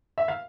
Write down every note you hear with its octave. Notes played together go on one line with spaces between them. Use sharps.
E5
F5